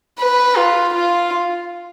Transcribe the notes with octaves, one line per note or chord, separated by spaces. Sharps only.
B4
F4
F4